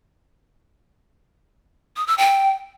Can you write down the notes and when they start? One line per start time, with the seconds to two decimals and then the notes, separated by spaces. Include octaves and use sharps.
1.97 D#6
2.07 E6
2.18 G5